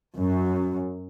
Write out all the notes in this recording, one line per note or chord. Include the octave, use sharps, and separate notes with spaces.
F#2